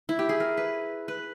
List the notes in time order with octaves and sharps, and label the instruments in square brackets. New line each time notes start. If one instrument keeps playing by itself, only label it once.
[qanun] E4
G4
G#4
A#4
B4
B4